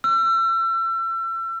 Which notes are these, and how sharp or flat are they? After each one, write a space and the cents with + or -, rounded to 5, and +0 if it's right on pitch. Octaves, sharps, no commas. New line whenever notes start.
E6 +35